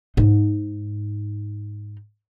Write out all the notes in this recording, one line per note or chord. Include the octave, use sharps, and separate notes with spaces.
G#2 D#4